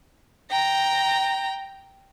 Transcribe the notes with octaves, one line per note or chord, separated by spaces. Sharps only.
G5 A#5